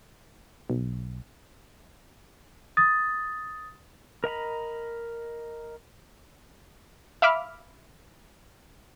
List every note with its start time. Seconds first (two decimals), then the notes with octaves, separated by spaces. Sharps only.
0.70 B1
2.77 D#6 A6
4.24 A#4 D#5 A#5 B5
7.22 E5 F5 B5 D6 F6